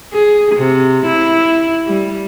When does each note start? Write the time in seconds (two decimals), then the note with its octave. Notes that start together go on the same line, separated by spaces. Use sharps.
0.13 G#4
0.55 C3
1.06 E4
1.87 G3